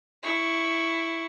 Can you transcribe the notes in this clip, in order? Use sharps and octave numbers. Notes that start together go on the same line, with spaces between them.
E4 C#6